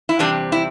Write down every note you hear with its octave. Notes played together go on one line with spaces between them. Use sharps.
E4
E2 C3 G3 C4 D4
E4